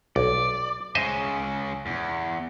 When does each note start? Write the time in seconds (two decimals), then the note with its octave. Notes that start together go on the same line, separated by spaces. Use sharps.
0.16 B1 D5
0.95 C#3 G#3 C5 D#5 E5
1.86 E2